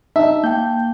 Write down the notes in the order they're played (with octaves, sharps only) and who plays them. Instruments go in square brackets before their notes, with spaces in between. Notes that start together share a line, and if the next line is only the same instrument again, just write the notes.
[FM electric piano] D#4 [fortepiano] E5 [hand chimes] A5
[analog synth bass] A#3 [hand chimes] G5 A5 [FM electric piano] G6